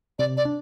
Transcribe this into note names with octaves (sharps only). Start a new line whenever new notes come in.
C3 D5
D5
D4